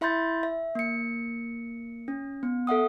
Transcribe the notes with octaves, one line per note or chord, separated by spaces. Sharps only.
E4 E5 B5 C6 G6 A6
E5
A#3 C#7
C#4
B3
A4 E5 F#5 D#6